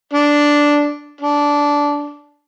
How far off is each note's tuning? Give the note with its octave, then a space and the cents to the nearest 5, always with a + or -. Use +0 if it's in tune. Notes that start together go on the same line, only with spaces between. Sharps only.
D4 -5
D4 -15